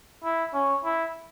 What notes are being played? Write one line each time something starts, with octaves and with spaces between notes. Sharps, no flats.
E4
C#4
E4